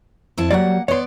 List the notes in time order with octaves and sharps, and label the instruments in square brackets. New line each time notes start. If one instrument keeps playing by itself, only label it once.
[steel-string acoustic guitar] F2 E4 A5
[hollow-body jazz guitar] F#3 G3 D5 [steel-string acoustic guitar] A#3 F#5
[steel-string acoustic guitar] B3 D5 [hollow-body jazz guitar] C#5 C6